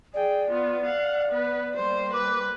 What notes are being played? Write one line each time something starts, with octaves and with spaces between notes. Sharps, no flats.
G#4 D5 G5
B3 F4
F5 F#5
B3 B4
G3 A#3 C5
B4 D6